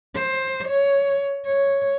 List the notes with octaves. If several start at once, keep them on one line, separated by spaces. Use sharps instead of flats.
C5
C#5
C#5